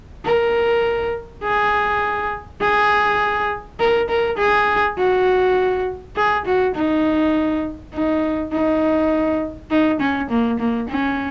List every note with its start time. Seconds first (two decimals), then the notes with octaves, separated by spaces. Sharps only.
0.25 A#4
1.44 G#4
2.61 G#4
3.80 A#4
4.09 A#4
4.38 G#4
4.98 F#4
6.16 G#4
6.45 F#4
6.75 D#4
7.93 D#4
8.52 D#4
9.70 D#4
10.00 C#4
10.30 A#3
10.59 A#3
10.89 C#4